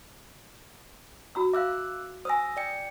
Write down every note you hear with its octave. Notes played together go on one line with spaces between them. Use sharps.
F#4 A#5 E6
E5 F5 D6 E6 F#6
C5 G#5 D#6 E6 A#6
D5 G5 C#7